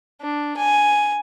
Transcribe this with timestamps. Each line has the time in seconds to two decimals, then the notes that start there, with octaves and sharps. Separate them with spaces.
0.21 D4
0.57 G#5